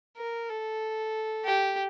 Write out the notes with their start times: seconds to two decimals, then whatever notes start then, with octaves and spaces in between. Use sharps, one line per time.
0.17 A#4
0.50 A4
1.45 G4